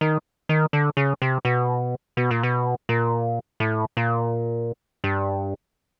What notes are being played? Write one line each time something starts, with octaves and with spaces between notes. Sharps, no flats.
D#3
D#3
D3
C#3
C3
B2
B2
A#2
B2
A#2
A2
A#2
G2